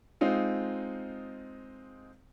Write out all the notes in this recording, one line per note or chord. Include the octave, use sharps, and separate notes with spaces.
G#3 C4 D#4 F4